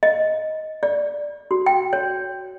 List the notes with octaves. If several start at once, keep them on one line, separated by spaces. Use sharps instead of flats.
D#5
D5
F#4
G5
C#5